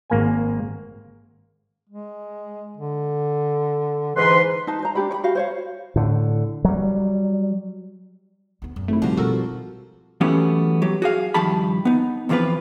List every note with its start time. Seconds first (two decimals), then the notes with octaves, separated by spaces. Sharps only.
0.10 G#1 A#3 G#5
1.89 G#3
2.77 D3
4.16 G#2 E3 B4 C6
4.67 D#4 A5
4.82 C5 A#5
4.95 D4 D#4 G4 B5
5.11 C#5 B5
5.24 F#4 G4 F5
5.35 C5 C#5 F5
5.96 A2 D3
6.65 F#3 G3
8.62 D2 B3
8.76 F#2
8.88 G#1 A3 E4
9.02 C3 D#3 F3 G3 D4 F#4
9.17 B2 F#4 A4 A#4
10.21 E3 F#3 A3 B3 C#4 G4
10.82 F#3 G4
11.02 F#4 G#4 F5
11.34 G2 D#3 F3 G4 A5 B5
11.85 B3 D#4
12.29 E2 C3 F3 F4 B4